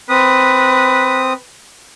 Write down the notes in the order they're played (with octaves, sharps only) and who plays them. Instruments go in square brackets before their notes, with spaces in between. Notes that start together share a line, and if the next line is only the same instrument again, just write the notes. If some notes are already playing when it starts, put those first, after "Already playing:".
[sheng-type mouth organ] C4 D#6 [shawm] B4